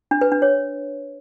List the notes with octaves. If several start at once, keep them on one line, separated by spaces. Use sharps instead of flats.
D4
B4
D4
C#5